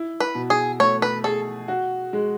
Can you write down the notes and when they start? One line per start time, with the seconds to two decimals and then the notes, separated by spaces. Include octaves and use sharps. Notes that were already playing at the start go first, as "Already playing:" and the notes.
Already playing: E4
0.20 B4
0.35 B2
0.50 G#4
0.80 A3 C#5
1.02 B4
1.24 G#4 A4
1.68 F#4
2.13 G#3